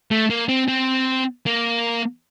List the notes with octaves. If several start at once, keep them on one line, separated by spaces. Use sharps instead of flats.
A3
A#3
C4
C4
A#3